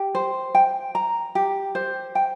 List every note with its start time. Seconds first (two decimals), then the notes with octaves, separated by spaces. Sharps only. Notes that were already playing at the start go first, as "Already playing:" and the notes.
Already playing: G4
0.15 C5
0.55 G5
0.95 A#5
1.35 G4
1.75 C5
2.15 G5